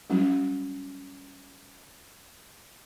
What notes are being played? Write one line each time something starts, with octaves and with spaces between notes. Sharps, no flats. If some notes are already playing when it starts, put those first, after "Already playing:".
F#3 G3 C#4 F#4